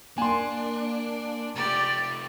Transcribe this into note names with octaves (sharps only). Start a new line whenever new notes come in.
A#3 D4 G#5 C6
C3 A3 G4 D5 A6